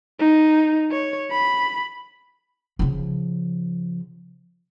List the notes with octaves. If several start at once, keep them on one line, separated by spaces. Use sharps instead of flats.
D#4
C#5
B5
C#3 F3